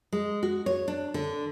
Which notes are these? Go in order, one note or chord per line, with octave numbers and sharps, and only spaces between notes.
G#3
F#4
C#5
D4
D3